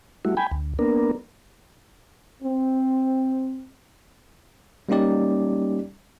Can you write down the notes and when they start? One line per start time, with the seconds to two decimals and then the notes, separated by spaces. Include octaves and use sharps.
0.25 G3 A3 E4 F#4
0.37 G5 G#5 B5
0.51 D2
0.79 A#3 B3 D4 A#4
2.43 C4
4.89 G3 A#3 C#4 D#4 G4 D5